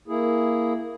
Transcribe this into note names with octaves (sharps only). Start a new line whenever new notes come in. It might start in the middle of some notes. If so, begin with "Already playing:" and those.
A#3 E4 G#4